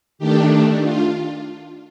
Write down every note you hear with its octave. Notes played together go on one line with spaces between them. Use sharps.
D#3 A3 D4 G4
F4